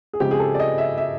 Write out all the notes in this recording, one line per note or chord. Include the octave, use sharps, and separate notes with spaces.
G#4
C#3 F3 G#3 C4 G4
G#4
A4
D5
D#5
E5
E5